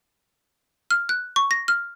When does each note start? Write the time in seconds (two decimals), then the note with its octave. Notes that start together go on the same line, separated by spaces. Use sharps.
0.91 F6
1.09 F#6
1.36 C#6
1.51 A#6
1.68 F6